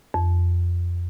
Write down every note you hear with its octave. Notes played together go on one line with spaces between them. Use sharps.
F2